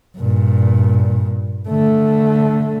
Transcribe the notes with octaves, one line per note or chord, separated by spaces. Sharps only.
G2 A#2
D3 A3